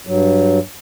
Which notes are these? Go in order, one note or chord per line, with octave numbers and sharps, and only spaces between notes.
G2 F#3